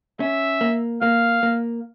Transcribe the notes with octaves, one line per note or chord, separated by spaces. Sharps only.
C#4 E5
A#3
A#3 F5
A#3